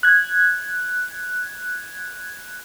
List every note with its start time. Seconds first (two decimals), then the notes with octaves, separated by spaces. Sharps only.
0.03 F#6 G#6